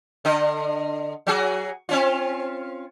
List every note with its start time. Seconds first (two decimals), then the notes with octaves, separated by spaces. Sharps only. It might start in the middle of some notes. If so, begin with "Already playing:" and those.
0.25 D3 D#5
1.27 F#3 F#4 G#4
1.89 C4 C#4 F4